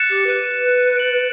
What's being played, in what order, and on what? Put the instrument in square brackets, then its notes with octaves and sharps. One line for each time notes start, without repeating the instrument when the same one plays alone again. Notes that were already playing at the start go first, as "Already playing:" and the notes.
Already playing: [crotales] F#6 A6 C#7 E7
[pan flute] G4
B4
[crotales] A6 D7 F#7